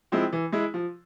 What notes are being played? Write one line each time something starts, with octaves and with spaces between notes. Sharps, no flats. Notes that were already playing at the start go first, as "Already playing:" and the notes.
F3 G#3 C4 E4
E3
G#3 E4
F3